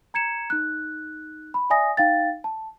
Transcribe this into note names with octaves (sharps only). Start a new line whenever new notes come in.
A#5 G#6 C#7 E7
D#4 F#6
B5
D5 E5 G#5 D#6 A#6
D#4 F5 G5 A6
A5